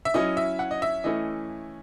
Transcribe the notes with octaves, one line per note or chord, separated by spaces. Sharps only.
E5
F#3 C#4 E4 D#5
E5
F#5
D#5
E5
E3 A3 C#4 E4 D#5